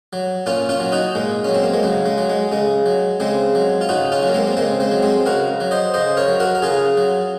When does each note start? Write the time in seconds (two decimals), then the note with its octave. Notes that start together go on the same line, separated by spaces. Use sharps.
0.13 F#3
0.46 A#2 C#4 F4
0.69 C#4 F4
0.80 F#3
0.92 D#4 F#4
1.15 A#2 G#3
1.44 F#3 C#4
1.54 C4
1.63 A#3
1.74 G#3
1.83 C#3 F#3
2.06 G#3
2.18 F#3
2.29 G#3
2.52 C#3 G#3
2.86 F#3
3.20 C#3 G#3 C4
3.55 F#3
3.81 F4
3.89 C#3 D#4 F#4
4.12 C#4 F4
4.22 F#3
4.28 A#3
4.34 G#3 C4
4.47 A#3
4.57 C#3 G#3 C4
4.80 G#3 C4
4.91 F#3
5.02 G#3 C4
5.26 C#3 F#4 A#4
5.60 F#3
5.71 C5 D#5
5.94 C#3 C5 D#5
6.17 A#4 C#5
6.28 F#3
6.40 F#4 A#4
6.55 A#4
6.62 C#3 F4 G#4
6.97 F#3